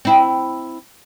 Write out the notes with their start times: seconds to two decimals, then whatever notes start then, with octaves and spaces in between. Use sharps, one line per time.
0.05 C4 E4